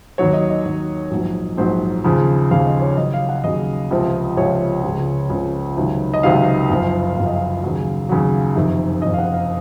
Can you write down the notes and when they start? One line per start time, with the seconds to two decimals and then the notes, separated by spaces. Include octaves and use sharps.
0.18 D#2 D#3 F#3 C#5
0.33 D#5
0.50 D#5
0.65 D#2 D#3 F#3
1.11 A#1 G#2 F#3
1.57 A#1 G#2 F#3 C5
2.04 D#2 C#3 F3
2.51 D#2 C#3 F3 F5
2.66 D#5
2.82 C#5
2.97 D#2 C#3 F#3 D#5
3.14 F5
3.29 F#5
3.44 D#2 C#3 F#3 D#5
3.91 C#2 C3 F3
4.37 C#2 C3 F3 C#5
4.84 C#2 C#3 F3
5.30 C#2 C#3 F3
5.77 C#2 C3 D#3 F#3
6.14 D#5
6.23 C#2 C3 D#3 F#3 F5
6.69 F#1 F#2 F3
7.16 F#1 F#2 F3 F5
7.26 D#5
7.36 F5
7.63 D#2 C#3 F#3
8.09 D#2 C#3 F#3
8.56 F#1 F2 C3 D#3
9.02 F#1 F2 C3 D#3 D#5
9.14 F5
9.19 F#5
9.34 F5